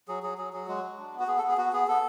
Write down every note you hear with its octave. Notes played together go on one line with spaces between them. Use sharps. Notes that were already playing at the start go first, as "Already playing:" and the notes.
F#3 G#4
F#3 G#4
F#3 G#4
F#3 G#4
G#3 F#4
G#3
D4
B3
F#4
B3 G#4
A4
B3
G#4
B3 F#4
B3 G#4
B3 A4